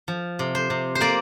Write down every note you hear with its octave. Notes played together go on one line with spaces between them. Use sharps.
F3
C3
C5
C3
C5
A#3 D5